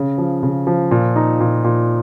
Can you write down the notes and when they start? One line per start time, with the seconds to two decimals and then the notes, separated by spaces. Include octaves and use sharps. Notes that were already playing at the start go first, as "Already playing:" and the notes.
Already playing: C#3
0.18 F3
0.43 C#3
0.67 F3
0.91 A#2
1.16 D#4
1.40 A#2
1.64 A#2